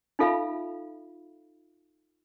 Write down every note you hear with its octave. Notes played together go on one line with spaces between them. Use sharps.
D#4 F4 A4 E5 F5 B5